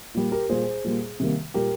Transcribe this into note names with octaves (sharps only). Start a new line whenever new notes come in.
A#2 G3 A#3
G4 A#4
A#2 G3 A#3 G#4 C5
A#2 G3 A#3
C3 D#3 G3 A#3
A#2 G3 A#3 G4 A#4